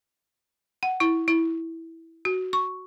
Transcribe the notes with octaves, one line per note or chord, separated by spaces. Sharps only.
F#5
E4
E4
F#4
C#6